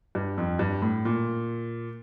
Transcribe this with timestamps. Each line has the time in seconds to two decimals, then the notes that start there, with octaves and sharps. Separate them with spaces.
0.15 G2
0.38 F2
0.59 G2
0.82 A2
1.05 A#2